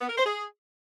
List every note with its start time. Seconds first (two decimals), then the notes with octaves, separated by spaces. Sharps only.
0.01 B3
0.09 A#4
0.18 C5
0.26 G#4